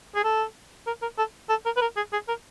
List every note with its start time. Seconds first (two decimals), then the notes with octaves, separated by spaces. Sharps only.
0.15 G#4
0.24 A4
0.87 A#4
1.02 A#4
1.18 A4
1.49 A4
1.65 A#4
1.77 B4
1.81 A#4
1.96 G#4
2.12 G#4
2.28 A#4